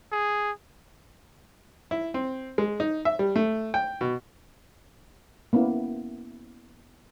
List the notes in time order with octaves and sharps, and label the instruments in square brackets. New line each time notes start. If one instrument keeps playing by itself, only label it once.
[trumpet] G#4
[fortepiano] E4
C4
G#3
D#4
E5
G3
A3
G5
B2
[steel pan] A#3 B3 C#4 E4